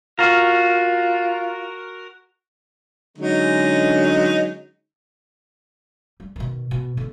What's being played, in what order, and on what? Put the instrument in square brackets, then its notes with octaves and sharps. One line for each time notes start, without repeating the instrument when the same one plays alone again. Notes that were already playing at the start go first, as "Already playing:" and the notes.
[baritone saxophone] F4 [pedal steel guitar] F#4 A#4
[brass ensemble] D3 G#3 C#4 [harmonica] F#3 D#4
[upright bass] G3
B2 D#3
B2
D3 B3